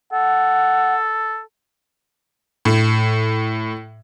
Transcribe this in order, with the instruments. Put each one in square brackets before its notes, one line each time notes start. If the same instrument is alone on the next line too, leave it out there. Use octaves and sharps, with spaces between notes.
[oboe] A4 [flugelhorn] F#5
[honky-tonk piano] A2